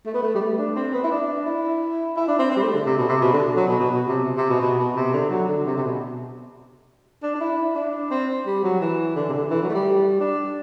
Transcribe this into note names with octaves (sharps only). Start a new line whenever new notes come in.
A3
B3
A3
G3
A3
D4
C4
B3
E4
D4
E4
E4
D4
C4
C4
G3
A3
D3
C3
B2
C3
B2
D3
F#3
B2
B2
B2
C3
C3
B2
B2
B2
C3
D3
F#3
D3
C3
C3
B2
D4
D4
E4
D4
C4
G3
F#3
E3
D3
C3
D3
E3
F#3
A3
G3
D4